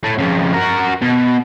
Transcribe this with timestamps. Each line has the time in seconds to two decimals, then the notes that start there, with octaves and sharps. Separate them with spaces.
0.04 A2 A3
0.18 F2 C#3
0.54 F#4 A#4
1.02 B2